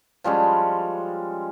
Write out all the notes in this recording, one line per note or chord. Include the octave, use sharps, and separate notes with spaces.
F3 G3 G#3 C#4